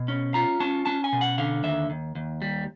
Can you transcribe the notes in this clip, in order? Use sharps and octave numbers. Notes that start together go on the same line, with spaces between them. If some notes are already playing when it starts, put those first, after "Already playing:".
Already playing: B2
C#4
F4 A#5
C#4 A5
C#4 A5
G#5
B2
F#5
D3 F5
D#2 E5
D#2
D#2
G3